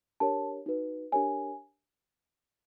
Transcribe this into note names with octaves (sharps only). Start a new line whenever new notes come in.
D4 G4 A#4 C#5 A5
D#4 F#4 B4
D4 G4 A#4 C#5 G#5